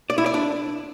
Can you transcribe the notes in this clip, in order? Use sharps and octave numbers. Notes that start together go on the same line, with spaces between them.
D5
E4
D5
D4